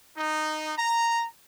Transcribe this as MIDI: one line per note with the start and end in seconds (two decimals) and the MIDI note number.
0.16 0.71 63
0.77 1.26 82